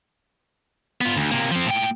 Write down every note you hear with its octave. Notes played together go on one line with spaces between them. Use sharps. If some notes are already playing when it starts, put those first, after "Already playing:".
B3 F4
D2
C3 A#3
F3 C4
A2 G5